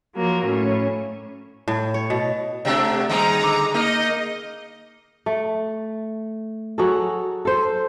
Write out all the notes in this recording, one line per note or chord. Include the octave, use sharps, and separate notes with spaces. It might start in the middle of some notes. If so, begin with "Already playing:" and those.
F3 F#3 A#3
A2 C#4
A2
C#5
B2
C3 F#3 A3 C4 D4
D#2 G3 G#3 C4 D#4 A#5
D3
A#3 D#4 D#5
A3
F#3 F#4 G#4 A4
A4 C5